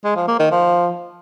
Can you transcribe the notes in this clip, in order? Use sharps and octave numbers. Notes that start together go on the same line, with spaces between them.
G#3
F3
A#3
D#3
F3